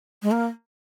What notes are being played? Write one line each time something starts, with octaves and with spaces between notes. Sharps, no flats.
G#3
A#3